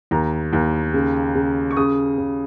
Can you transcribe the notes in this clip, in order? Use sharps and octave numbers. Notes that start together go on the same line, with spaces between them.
D#2 A#5
D#2
C#3
C#3
C#6
C#3 D#6
C#3